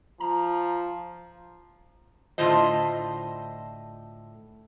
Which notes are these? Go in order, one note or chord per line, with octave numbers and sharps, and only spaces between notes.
F3 A#5
A2 D3 F4 C5 D#5